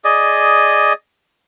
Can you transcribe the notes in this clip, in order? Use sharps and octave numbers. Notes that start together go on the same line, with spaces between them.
G#4 D5 D#5